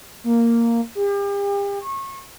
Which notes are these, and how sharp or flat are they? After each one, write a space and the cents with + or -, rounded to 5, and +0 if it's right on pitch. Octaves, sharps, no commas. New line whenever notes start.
A#3 -5
G4 +40
C#6 -30